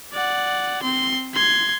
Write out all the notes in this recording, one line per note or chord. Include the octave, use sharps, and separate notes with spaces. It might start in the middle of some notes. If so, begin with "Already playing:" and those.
D5 F#5
C4 C6
C6 G#6